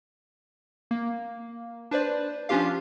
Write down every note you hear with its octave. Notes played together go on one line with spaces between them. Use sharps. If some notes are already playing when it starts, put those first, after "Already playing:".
A#3
D4 B4 C5 D5
F3 C#4 D4 F4 G4 F5